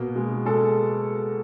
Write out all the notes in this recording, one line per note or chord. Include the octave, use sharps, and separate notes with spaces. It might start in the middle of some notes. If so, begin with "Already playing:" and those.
Already playing: B2 A#3
G#3
G#3 A4